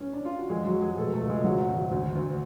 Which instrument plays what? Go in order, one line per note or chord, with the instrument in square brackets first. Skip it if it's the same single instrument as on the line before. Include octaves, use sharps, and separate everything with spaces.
[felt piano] C#4
D4
F4
F#4
F2 G#3 G#4
F#3 F#4
F2
G#3 G#4
B2 A3 A4
A3 A4
C#2
G#3 G#4
G#1 F#3 F#4
G#1
D2
D2